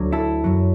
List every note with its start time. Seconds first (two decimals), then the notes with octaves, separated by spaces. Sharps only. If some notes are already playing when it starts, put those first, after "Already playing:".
Already playing: D2 D3 F#3
0.13 E4 A4
0.44 F#2 F#3